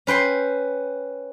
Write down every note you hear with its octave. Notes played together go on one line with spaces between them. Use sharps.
C#4 B4 G5 C6